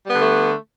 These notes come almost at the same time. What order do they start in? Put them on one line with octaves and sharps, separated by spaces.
G3 B3 D3 A3